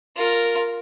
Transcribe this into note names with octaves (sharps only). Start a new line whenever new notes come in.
F4 A#4